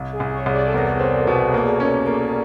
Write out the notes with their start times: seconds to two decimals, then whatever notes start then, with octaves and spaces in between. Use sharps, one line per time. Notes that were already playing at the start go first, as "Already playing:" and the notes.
Already playing: C2
0.13 G#4
0.20 C2
0.34 C#5
0.46 C2
0.53 D5
0.67 A4
0.73 E2 A#4
0.99 C4
1.27 B2
1.54 A#3
1.80 C#4
2.07 A#3